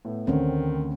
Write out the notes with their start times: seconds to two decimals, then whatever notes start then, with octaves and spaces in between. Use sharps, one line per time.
0.05 A2 A3 B3
0.27 D2 D3 D#3 C4 C#4